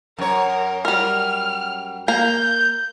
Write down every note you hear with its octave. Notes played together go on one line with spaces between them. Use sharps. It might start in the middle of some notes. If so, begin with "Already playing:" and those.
F#2 A#4 C#5
G3 A#4 F6
A#3 A#5 G6